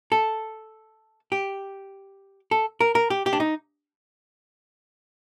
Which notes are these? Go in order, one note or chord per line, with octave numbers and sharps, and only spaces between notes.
A4
G4
A4
A#4
A#4
G4
G4
D4
D#4